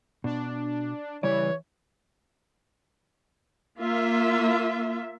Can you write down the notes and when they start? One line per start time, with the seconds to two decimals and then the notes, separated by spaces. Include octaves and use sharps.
0.24 B2 D4
1.23 C#3 E3 G3 C#5 D5
3.78 A#3 F4 E5